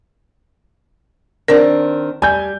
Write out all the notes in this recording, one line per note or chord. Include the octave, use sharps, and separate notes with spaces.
D#3 C4 D4 A#4
G3 G#5 G6